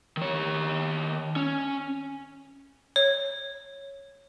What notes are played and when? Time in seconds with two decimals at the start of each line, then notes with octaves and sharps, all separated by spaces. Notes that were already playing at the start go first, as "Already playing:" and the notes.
0.17 D#3 C#5
1.36 C#4
2.96 C#5